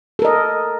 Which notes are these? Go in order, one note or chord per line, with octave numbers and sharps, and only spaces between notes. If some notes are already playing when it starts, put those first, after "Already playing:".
A4 A#4 D#5